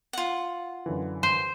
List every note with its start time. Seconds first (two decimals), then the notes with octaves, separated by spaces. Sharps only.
0.13 F4 F#5
0.86 F#2 D3 E3
1.23 C5